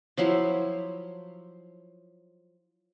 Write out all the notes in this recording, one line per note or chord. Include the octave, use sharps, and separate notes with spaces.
F3 F#3 E4 C5